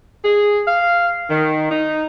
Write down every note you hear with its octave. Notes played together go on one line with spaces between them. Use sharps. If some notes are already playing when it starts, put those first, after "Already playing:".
G#4
F5
D#3
D#4